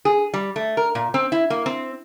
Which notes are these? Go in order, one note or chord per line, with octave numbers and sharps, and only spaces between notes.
G#4
G3
A3
A#4
A#2
C4
E4
A#3
C4